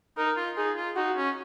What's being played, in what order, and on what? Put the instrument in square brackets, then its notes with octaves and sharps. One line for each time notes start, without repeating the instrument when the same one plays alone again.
[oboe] D#4 [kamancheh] A#4
[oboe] F4
[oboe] D#4 [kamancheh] G#4
[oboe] F4
[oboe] D#4 [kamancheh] F#4
[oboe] C#4